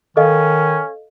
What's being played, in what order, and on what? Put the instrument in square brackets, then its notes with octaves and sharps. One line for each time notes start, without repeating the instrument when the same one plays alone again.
[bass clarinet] D#3 [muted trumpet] C#4 [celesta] A4 D#5 F5